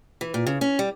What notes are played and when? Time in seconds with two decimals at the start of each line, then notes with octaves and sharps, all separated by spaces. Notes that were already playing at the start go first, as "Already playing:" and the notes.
0.21 E3
0.34 A#2
0.47 C#3
0.61 C#4
0.79 G3